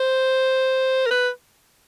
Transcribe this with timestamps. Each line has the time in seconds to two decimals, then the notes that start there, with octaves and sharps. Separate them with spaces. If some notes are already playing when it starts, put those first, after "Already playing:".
Already playing: C5
1.06 A#4
1.11 B4